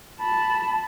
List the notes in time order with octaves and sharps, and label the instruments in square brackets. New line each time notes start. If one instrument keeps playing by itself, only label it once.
[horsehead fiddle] A5 B5